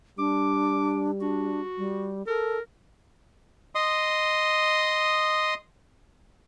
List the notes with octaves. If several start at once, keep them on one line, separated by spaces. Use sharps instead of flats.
G3 D4 D6
D4 F#4
G3
A4 A#4
D#5 C6 D#6